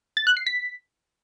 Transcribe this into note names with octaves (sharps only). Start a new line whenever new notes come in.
A6
F#6
C7
B6